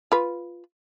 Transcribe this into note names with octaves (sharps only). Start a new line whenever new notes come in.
F4 B4